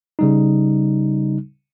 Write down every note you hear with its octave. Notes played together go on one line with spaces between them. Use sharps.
C#3 G3 D#4